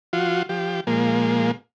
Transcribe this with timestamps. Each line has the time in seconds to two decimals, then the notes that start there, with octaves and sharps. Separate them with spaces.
0.13 F3 F4 F#4
0.49 F3 G4
0.87 A#2 F3 G#3 A#3